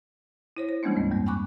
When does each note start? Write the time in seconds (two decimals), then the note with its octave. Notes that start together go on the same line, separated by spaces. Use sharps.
0.57 E4 C5 C#5
0.69 C5
0.83 E3 G3 G#3 A#3 C#4 D4
0.96 D2 G#2 C4
1.11 F#2 G3 A#3
1.26 G5 G#5 B5 C#6 D6 F#6